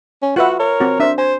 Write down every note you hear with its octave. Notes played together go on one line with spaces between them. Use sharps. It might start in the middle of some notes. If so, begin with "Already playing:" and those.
C#4
F4 F#4 B4 E5 F#5
A#4 C#5
C4 F#4
D4 C5 E5
C5 G#5